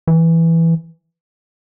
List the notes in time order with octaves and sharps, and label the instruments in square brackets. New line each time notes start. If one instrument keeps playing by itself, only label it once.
[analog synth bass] E3